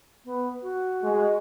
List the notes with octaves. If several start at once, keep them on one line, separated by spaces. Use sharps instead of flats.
B3
F#4
G#3